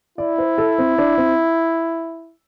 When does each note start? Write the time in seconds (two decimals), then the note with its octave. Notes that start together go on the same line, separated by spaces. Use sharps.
0.18 E4 D5
0.38 C5
0.58 A4
0.78 C4
0.98 D4
1.17 C4